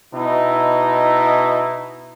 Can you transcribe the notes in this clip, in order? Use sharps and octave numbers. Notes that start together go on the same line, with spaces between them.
B2 D#4 E4